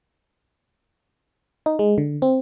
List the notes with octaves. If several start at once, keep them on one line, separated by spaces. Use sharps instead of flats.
D#4
G#3
D3
C4